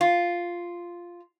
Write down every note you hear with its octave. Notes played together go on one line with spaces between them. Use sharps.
F4